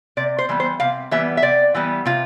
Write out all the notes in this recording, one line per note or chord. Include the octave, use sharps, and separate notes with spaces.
C3 D5
C5
E3 G3 B3
C5
C3 F5
E3 G3 B3 E5
E5
C3 D5
E3 G3 B3
C3 F4